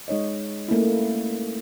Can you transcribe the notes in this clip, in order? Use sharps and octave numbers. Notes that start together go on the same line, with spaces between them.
G#3 D#4 C#5 D#5
A3 A#3 C#4 E4